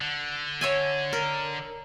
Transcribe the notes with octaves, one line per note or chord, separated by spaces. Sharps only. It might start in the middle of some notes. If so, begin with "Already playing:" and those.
D3
C#5 E5 G#5
A#4